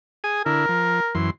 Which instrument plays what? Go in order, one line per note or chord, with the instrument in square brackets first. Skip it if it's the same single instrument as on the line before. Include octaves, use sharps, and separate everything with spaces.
[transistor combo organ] G#4 G#5 D#6
[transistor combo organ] D3 E4 [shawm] A#4
[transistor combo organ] F3
F#2 E3 C6